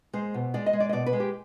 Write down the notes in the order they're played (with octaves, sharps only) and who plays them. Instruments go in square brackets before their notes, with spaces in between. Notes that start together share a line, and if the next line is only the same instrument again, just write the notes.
[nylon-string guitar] G#3 C5
B2
G#3 D5
D#5
G#3
D5
D#5
B2 D5
B4
G#3
G4